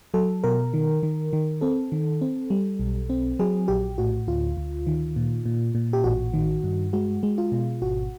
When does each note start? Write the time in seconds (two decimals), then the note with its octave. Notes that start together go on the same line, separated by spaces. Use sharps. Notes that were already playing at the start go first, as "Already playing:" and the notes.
0.14 F#3 A4
0.44 B2 A#4
0.74 D#3
1.03 D#3
1.33 D#3
1.61 C4 A4
1.92 D#3
2.21 C4
2.50 G3
2.79 B1
3.10 C4
3.39 F#3 G#4
3.68 A#1 G4
3.98 A2 F#4
4.28 D2 F4
4.57 D2
4.87 D#3
5.16 A#2
5.46 A#2
5.75 A#2
5.93 G4
6.04 A1 F#4
6.34 D#3
6.64 G2
6.93 G#3 F#4
7.23 G#3
7.38 F4
7.52 B2
7.82 G#1 F#4